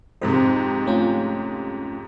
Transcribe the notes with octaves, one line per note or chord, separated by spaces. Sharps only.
F2 G#2 C3 C5
A3 C#4 F4